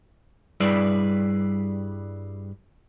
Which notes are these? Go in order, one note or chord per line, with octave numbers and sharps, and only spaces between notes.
G2 G3 E4 G#4 B4 D5